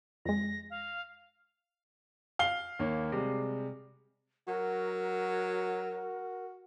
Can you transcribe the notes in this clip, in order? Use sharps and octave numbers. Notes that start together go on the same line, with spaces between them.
F2 G#3 A#6
F5
F5 G7
D#2 A#3 C#5
C3 G3 G#3
F#3 F#4 A#4